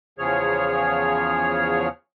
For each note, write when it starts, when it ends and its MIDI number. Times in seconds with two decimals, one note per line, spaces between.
0.19 1.88 40
0.19 1.88 49
0.19 1.88 53
0.19 1.88 68
0.19 1.88 73
0.19 1.88 89